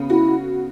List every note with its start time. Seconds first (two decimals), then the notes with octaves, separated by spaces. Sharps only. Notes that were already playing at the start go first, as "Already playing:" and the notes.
Already playing: C#3 B3
0.10 E4 F#4